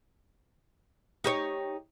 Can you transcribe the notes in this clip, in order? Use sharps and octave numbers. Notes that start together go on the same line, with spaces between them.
D#4 G4 C#5